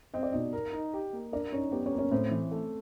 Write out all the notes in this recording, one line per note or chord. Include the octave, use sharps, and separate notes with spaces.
C4 D#5
D5
B2 D#4 D#5
A#4
D#4
G4
A#3
D4 A#4 D5
C#4 D#4 C#5
B3 G4 B4
C#4 C#5
A#3
C#4 C#5
A2 C4 C5
E3
A3